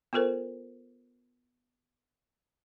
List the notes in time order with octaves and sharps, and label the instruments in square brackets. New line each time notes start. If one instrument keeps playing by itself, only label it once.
[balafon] B3 F4 A4 A#4 C5